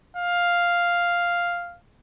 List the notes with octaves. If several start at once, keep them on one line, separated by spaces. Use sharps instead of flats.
F5